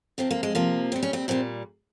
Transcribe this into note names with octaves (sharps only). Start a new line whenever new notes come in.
C3 F3 C4
A#3
G#3
C3 F3 A#3
A#2 G3 C4
C#4
C4
A#2 G3 C4